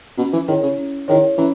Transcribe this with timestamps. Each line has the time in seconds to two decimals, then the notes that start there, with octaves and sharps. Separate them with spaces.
0.18 B2 C#4
0.33 E3
0.48 D#3 E4 G#4 C#5
0.63 C#3
0.78 C#4
1.08 D#3 E4 G#4 C#5
1.38 E3 C#4